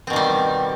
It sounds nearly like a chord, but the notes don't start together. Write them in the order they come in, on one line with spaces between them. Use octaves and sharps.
C4 B2 D#3 G3